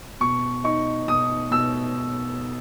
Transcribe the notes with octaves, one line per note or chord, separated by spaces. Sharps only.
B2 C#6
D#4 C#6
B2 D#6
B2 E6